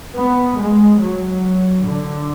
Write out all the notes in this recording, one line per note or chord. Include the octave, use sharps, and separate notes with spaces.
B3
G#3
F#3
D3